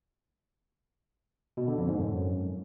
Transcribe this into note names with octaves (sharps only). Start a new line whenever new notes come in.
B2
D3
F2
G#2
F#2